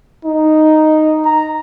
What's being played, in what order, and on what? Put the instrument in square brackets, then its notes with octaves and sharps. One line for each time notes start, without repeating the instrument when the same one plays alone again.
[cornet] D#4
A#5